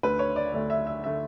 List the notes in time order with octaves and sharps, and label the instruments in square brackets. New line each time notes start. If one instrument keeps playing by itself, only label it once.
[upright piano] D2 D3 A3 B4
C#5
D5
D2 D3 A3 D5
E5
E5
D3 A3 E5